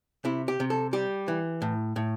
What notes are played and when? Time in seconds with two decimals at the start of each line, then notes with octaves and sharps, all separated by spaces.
0.25 C3 E4
0.48 G4
0.60 C3
0.70 A4
0.93 G3 G4
1.28 E3
1.62 A2
1.96 A2